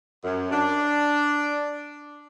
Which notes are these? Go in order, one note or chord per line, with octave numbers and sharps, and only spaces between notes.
F#2
D4